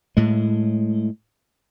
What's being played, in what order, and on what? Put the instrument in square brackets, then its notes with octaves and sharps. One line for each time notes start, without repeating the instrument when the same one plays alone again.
[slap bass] A2 G#3